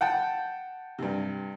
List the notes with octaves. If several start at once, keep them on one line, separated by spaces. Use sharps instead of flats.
F#5 G5 A5
G2 C3